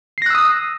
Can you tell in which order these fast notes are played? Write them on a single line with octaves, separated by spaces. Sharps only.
C7 A#6 F#6 E6 D#6